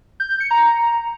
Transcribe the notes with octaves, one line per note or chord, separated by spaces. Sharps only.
G6
G6
C#7
A#5